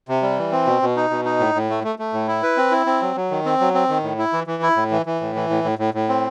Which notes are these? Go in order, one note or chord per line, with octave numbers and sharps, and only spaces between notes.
C3
G3
E3
C4
B2
B2
D#4
B2
D#4
A2
A2
A3
A3
A3
A2
E4
B4
C4
E4
C4
F#3
F#3
D#3
C4
F#3
C4
D#3
A2
E4
E3
E3
E4
A2
E3
E3
A2
E3
A2
A2
A2
A2
C4